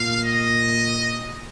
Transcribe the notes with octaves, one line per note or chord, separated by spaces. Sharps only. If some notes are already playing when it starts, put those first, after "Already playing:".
Already playing: A#2 F5
D#5